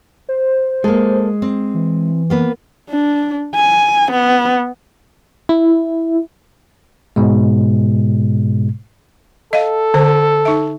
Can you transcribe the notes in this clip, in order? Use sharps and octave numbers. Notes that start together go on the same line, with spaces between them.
C5
G#3 A#3 A4
C4
E3
A#3 B3 B4
D4
G#5
B3
E4
G#2 B2 G#3
A4 D#5 F5
D3 C5
D#4 E5